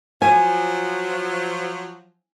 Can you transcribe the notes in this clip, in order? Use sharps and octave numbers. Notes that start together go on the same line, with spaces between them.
F3 F#3 G#5